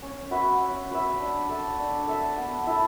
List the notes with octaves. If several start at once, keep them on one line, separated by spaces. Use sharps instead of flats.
C#4
F#4 B4 E5
C#4
F#4 B4 E5
D4
A4 E5
D4
A4 E5
B3
E4 A4